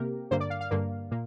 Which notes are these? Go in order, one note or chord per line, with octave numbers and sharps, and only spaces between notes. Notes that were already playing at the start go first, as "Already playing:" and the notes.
Already playing: C3 A#3 G4 A#4
G2 D3 A#3 C5
D5
F5
F5
G2 D3 A#3
A#2 A#3